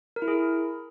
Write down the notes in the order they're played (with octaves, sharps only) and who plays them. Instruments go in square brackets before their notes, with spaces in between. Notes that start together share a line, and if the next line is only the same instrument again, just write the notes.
[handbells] A#4
E4
G#4